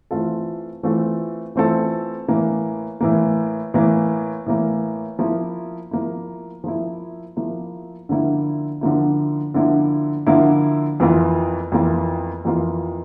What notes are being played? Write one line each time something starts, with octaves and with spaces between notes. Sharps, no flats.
E3 A3 C4 F4 A4
E3 A3 C4 F4 A4
E3 A3 C4 F4 A4
A2 E3 A#3
A2 E3 A#3
A2 E3 A#3
A2 E3 A#3
F3 A#3 E4
F3 A#3 E4
F3 A#3 E4
F3 A#3 E4
D3 F3 A#3 E4
D3 F3 A#3 E4
D3 F3 A#3 E4
D3 F3 A#3 E4
F2 E3 A#3 F4
F2 E3 A#3 F4
F2 E3 A#3 F4